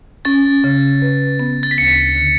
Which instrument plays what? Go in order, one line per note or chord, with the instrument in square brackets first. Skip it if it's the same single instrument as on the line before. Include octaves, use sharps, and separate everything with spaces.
[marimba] C#4 [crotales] A6
[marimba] C#3
B4
B3
[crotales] A6
B6
[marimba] D2 [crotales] C#7
[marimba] D3